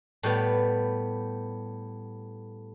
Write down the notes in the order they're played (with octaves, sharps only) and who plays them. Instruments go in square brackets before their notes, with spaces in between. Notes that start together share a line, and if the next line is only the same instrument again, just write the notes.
[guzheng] A2 G3 B3